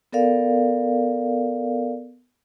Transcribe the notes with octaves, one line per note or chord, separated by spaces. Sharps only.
B3 A4 A#4 D5 F5